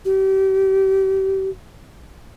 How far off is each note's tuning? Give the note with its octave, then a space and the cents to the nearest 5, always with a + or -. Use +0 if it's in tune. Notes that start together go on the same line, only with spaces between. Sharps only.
G4 -35